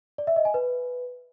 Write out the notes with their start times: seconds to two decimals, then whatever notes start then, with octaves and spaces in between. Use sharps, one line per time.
0.18 D5
0.27 E5
0.36 D#5
0.45 G#5
0.54 B4